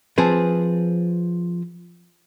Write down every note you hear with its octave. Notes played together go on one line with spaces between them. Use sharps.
F3 C4 G#4 B4